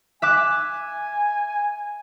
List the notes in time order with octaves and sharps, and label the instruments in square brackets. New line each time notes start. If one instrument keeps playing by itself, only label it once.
[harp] E5 D6 F#6 [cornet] G#5